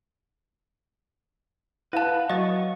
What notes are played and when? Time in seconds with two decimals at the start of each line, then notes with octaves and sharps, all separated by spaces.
1.93 E4 B4 F5 F#5 A5
2.30 F#3 D#5 C#6 A6